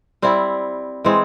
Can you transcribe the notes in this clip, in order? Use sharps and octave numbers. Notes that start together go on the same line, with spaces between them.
G3 C4 E4
E3 G#3 C4